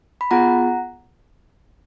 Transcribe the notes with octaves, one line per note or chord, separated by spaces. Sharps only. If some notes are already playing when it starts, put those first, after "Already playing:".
B5
B3 F4 G#4 F#5 A#5